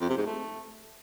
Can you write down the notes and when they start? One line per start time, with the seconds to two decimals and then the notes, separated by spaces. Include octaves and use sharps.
0.01 F2
0.09 C3
0.18 G#2
0.26 A3